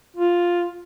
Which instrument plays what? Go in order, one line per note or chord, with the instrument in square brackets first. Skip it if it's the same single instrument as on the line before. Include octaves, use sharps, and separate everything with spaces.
[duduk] F4